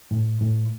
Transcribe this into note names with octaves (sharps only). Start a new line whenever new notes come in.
A2
A2